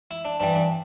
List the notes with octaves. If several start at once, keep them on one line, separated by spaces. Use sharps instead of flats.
E4
D4
G2 E3 G3 D4
D4